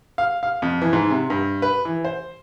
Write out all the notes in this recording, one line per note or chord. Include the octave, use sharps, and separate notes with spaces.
F5
F5
F2
E3
G#2
C3
G2
B4
E3
C5